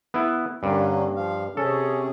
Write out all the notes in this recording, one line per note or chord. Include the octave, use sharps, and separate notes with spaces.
B3 E4
G2 D3 A#3 C#4
F3 F5
C3 C#4 G#4 A4